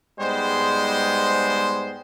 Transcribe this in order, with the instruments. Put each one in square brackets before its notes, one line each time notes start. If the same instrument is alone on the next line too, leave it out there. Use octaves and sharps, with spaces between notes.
[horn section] G#2 G3 G#3 B3 C5